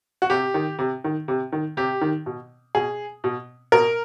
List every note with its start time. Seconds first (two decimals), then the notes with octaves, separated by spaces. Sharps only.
0.22 F#4
0.30 C3 G4
0.54 D#3
0.79 C3
1.04 D#3
1.28 C3
1.52 D#3
1.77 C3 G4
2.01 D#3
2.26 B2
2.75 B2 G#4
3.24 B2
3.72 B2 A#4